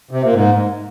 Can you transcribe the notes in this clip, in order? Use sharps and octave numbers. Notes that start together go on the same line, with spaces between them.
C3
A#2
G#2